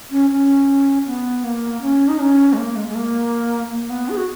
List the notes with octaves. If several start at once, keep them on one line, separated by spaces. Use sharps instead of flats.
C#4
C#4
B3
A#3
C#4
D#4
C#4
G#3
A#3
G#3
G#3
A#3
A#3
B3
G#4
F#4